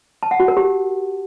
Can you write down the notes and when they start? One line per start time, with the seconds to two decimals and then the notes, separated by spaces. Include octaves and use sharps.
0.23 A5
0.31 F#5
0.40 F#4
0.48 A#4
0.57 G4